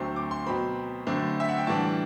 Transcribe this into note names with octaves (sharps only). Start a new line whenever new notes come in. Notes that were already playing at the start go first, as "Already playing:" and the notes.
Already playing: D2 D3 F#3 A3 C4 C6
D6
C6
B2 F#3 C4 B5
F#2 D3 A3 C4
E5
F#5
G5
A2 E3 G3 D4 A5